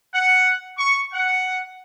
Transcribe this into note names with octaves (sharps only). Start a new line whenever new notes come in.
F#5
C#6
F#5